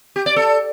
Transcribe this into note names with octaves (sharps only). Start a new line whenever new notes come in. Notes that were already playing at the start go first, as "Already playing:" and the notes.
G4
D5
A4